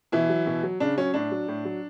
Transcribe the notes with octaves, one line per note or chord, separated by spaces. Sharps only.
B2 E3 E4
F#3
B2
F#3
C#3 D4
F#3 C#4
A2 D4
F#3
A2
F#3